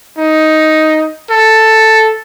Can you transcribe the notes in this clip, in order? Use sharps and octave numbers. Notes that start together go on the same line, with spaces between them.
D#4
A4